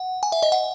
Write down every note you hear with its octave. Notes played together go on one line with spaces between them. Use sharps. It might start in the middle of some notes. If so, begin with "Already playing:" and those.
Already playing: F#5
G#5
E5
D#5
F#5